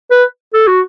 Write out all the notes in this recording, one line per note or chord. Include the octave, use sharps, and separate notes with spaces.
B4
A4
F#4